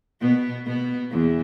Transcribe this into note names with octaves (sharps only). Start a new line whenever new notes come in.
B2 B3
B2 B3
E2 E3